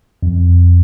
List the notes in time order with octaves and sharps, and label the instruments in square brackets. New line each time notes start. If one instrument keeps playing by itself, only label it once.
[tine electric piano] F2